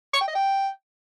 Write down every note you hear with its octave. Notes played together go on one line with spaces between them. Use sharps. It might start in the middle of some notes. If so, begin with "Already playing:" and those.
C#6
G5
D#5
G5